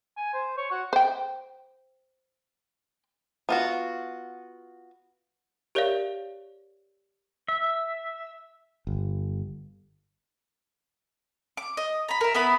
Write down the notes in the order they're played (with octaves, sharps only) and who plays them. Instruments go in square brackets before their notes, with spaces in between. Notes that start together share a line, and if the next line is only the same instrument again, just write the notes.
[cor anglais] G#5
C5
C#5
F#4
[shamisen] C5 G5
[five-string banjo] B3 F4 F#4
[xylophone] G4 A#4 C#5 D5 E5 F5
[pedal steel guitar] E5
[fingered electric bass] G1
[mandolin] D6
D#5
A#5 B5
A#4 E5
B3 E4 B5